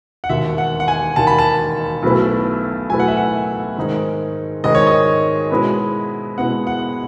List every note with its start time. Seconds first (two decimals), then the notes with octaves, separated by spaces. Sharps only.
0.24 F#5
0.29 E1 D#2 D#3 E5
0.58 F#5
0.80 F#5
0.88 G#5
1.16 E1 D#2 D#3 A5
1.27 B5
1.39 A5
2.03 B1 B2 A3 E4 B4
2.90 B1 B2 A3 E4 B4 G#5
2.99 F#5
3.08 E5
3.17 F#5
3.77 G#2 D#3 G#3 D#4 G#4
4.64 G#2 D#3 G#3 D#4 G#4 D#5
4.75 C#5
4.87 D#5
5.50 B2 G#3 B3 E4
6.38 B2 G#3 B3 E4 F#5
6.67 F#5